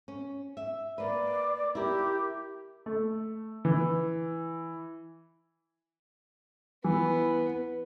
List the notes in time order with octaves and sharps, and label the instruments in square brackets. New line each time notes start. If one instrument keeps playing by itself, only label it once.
[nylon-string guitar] C#4
E5
[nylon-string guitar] A#3 B4 [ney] D5
[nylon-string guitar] E4 A#4 [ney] G4
[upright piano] A3
E3
[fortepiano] E3 [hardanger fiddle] B3